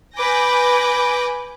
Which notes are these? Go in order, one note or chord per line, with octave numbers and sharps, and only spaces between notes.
B4 G#5 D6 G6 A#6